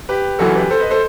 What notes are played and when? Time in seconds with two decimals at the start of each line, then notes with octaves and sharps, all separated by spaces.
0.09 G4 B4
0.39 F#1 F#2 E3 F#4 A4
0.55 G4 B4
0.70 A4 C5
0.80 B4 D#5
0.91 A4 C5